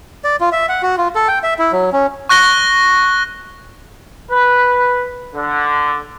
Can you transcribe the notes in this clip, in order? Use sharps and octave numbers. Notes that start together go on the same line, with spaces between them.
D5
F4
E5
F#5
F#4
F4
A4
G5
E5
E4
F#3
C#4
C#6 F#6 A#6 G7
B4
D3